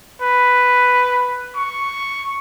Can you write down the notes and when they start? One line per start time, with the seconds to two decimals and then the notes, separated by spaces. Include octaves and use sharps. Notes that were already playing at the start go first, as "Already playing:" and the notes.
0.22 B4
1.56 C#6